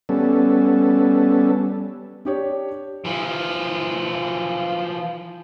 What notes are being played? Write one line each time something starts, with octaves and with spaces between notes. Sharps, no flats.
G3 B3 C#4 A4
D4 G4 C#5
E3 F3